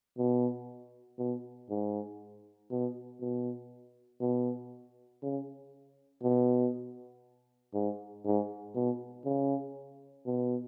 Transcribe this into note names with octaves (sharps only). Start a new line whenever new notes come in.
B2
B2
G#2
B2
B2
B2
C#3
B2
G#2
G#2
B2
C#3
B2